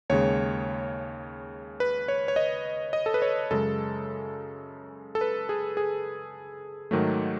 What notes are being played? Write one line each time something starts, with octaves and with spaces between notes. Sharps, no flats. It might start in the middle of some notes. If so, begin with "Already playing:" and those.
D#2 C#3 G#3 C#5
B4
C#5
C#5
D#5
D#5
A4
B4
C#5
F#2 C#3 G#3 A4
A4
B4
G#4
G#4
G#2 D#3 F#3 A3